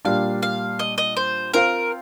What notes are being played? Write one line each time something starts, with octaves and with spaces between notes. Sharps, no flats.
A#2 G3 D4 F5
F5
D#5
D#5
C5
C4 F4 A#4 C5 F5